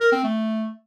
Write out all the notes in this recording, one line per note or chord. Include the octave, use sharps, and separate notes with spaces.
A#4
C4
A3